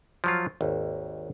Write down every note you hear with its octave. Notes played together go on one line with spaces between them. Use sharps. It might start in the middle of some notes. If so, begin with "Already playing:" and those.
F3 F#3 F4
G#1 D#2